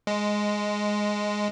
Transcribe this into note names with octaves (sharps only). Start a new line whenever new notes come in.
G#3